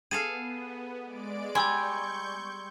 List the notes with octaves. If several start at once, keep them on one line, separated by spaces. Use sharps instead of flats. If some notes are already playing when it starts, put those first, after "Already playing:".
B3 G#4 A4 F5 D#7
G#3 D5 D7
G3 G#5 C6 C#6 E6 G6 G#6